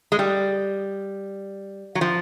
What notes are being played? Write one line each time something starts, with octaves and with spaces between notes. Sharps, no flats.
G#3
G3
F#3
F3